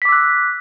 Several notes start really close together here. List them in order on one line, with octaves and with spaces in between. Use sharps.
B6 D6 E6 F#6